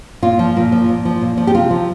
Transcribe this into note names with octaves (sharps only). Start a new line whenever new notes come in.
A#2 F4
F3
A#2
F3
A#2
F3
A#2
F3
G4
C3 F4
F3